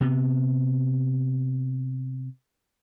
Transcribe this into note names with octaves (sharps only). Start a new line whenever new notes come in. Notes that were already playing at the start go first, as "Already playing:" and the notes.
C3 B3